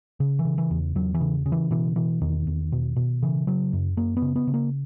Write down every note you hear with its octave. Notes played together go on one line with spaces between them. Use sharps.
C#3
E3
C#3
E3
E2
E2 F#3
E3
C#3
C#3
E3
B2 E3
B2 E3
E2 D#3
E2
B2
B2
C#3 E3
C#3 F#3
F#2
F#2 A#3
B3
C#3
B3
C#3
A#3